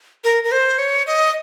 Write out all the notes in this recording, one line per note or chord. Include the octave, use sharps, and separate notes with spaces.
A#4
A#4
C5
C#5
D#5